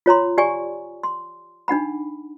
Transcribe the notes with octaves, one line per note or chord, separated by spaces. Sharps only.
F4 C#5 A#5 C6
G4 D5 G#5 C#6
C6
D4 D#4 F#5 B5